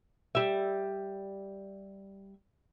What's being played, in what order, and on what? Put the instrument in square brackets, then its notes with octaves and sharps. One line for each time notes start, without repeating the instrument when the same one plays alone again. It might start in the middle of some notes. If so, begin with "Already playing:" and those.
[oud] G3 E5